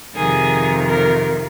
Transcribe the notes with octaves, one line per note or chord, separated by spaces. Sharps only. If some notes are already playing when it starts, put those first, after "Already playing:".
F2 C3 D#3 G#4
A#4